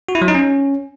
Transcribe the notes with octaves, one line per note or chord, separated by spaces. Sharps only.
F#4
E4
F#3
D#4
C#4